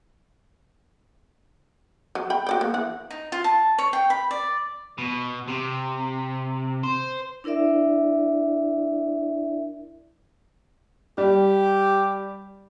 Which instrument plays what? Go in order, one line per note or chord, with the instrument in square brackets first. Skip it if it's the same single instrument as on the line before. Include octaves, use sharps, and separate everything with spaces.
[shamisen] F#3
G5 B5
F#4 D5 G5
A#3
E3 F#5
[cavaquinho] D#4
F4
A5
C#5
G5
B5
D5
[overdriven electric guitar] B2
C3
C5
[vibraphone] D4 E4 A#4 D5 E5
[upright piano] G3 [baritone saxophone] G4